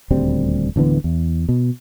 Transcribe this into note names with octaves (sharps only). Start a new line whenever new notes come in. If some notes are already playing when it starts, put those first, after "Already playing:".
D#1 D2 G3 C4
D1 D3 E3 B3
E2
B2